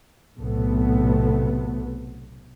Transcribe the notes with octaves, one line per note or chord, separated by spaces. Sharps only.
B1 A2 C3 A3 B3